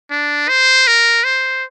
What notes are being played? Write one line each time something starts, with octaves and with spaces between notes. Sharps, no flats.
D4
C5
A#4
C5